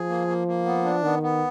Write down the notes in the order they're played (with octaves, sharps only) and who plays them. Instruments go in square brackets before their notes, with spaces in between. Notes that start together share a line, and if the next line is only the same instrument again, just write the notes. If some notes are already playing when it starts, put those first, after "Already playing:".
Already playing: [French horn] F3 [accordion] G#4
[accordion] A#3
A#3
A#3
B3
D4
[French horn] D#3 [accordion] B3
[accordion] B3